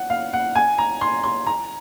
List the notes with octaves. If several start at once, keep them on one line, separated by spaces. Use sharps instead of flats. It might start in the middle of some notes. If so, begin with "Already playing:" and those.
Already playing: F#5
F5
F#5
G#5
A#5
C6
C6
A#5